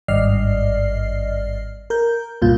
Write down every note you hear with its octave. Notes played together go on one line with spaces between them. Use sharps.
G#1 G2 D5 D#5 F6 C7
A#4 G6
C2 G2 A#2 F4 G6